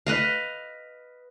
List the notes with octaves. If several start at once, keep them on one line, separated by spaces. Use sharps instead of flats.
B4 D#5 F5